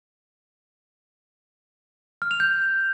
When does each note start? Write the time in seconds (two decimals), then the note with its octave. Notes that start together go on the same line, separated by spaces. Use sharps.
2.22 F6
2.31 F7
2.40 G6